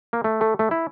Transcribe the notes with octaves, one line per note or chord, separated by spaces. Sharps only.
A#3
A3
A3
A3
E4